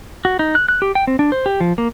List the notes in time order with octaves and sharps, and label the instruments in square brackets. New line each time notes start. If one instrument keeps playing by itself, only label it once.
[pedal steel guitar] F#4
D#4
F#6
F#6
G4
G5
C4
D4
C5
G4
F3
A#3